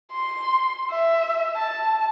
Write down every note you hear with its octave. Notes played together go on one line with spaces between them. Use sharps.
C6
E5
A5